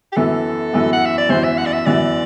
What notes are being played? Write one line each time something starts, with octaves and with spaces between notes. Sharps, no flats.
G4
F#2 E3 B3 A4
F#2 E3 B3
F#5
E5
D5
F#2 E3 B3 C5
E5
F#5
D5
E5
F#2 E3 B3 D5